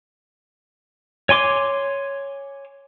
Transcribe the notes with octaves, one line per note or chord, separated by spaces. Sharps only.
C#5 G#5 C6 D6